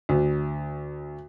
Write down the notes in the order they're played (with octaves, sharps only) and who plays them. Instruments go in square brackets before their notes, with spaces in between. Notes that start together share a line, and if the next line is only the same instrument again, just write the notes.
[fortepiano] D2